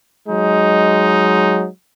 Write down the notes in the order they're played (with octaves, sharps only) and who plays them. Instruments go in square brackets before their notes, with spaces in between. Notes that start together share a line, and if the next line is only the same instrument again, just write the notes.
[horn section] F#3 G#3 D#4